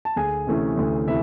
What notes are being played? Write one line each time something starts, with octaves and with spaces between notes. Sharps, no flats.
A5
D2 G#4 G#5
C3 E3 A3 C#4
D2
C3 E3 A3 E4 E5